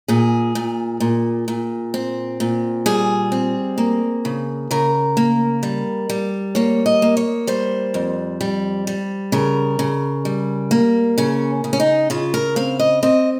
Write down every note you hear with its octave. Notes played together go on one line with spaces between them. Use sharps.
A#2 G#4
A#2
A#2
A#2
C4
A#2
G3 G#4
C4
A#3
C#3
C#3 A#4
A#3
G3
G3
A#3 C#5
D#5
A#3
C#5
G3 C5
F2
G3
G3
C#3 A#4
C#3
G3
A#3
C#3 C#4
C#3
C#4
D#4
C#3 F4
A#4
C4 F5
D#5
C4 D#5